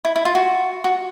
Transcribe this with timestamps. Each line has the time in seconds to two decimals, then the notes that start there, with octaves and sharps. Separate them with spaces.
0.05 E4
0.16 E4
0.25 F4
0.35 F#4
0.84 F#4